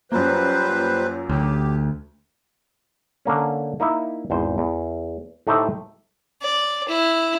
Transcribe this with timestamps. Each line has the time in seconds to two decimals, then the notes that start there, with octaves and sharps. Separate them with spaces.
0.12 F#2 G3 A#3 F4 B4 C5
1.30 D2 G4
3.25 D3 A#3 C#4
3.80 A#3 D#4 E4 E5
4.30 G#1 E2 C5
4.58 E2
5.47 A2 A3 D#4 G4 C5 E5
6.42 D5
6.89 E4